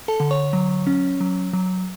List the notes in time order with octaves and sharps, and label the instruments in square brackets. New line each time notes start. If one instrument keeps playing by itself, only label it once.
[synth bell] A4 A5
D3
C#5 C#6
F#3
C#4
F#3
F#3